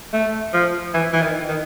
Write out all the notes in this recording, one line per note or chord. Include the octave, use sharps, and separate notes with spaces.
A3
F3
E3
E3
D#3
D#3